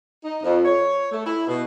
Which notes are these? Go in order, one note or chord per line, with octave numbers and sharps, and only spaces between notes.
D#4
F2
C#5
A3
E4
B2